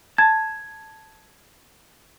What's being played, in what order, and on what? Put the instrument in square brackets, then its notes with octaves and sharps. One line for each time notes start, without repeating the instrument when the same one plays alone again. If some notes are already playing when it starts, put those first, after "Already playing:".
[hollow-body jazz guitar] A5 [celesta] G#6